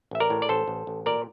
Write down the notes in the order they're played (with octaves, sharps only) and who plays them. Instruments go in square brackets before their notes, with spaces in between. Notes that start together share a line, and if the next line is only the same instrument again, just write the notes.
[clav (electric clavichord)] A1 E5
A#4 D5
A2
D5
A1 A4 C5
A1
A1
A#2 A#4 D5